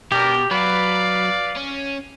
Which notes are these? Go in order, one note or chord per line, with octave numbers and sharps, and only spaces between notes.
B2 D4 G4 A#4
F#3 B4 D5 F5
C#4